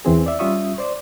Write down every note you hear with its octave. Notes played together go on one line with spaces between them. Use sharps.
E2 E3 C4 G#4
D5 E5
G3 C#4 F4 E5 C#6 D#6
C5 D5